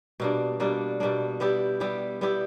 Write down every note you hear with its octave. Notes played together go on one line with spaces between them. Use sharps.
B2 G3 A#3 D4
B2 G3 A#3 D4
B2 G3 A#3 D4
G3 B3 E4 G4
G3 B3 E4 G4
G3 B3 E4 G4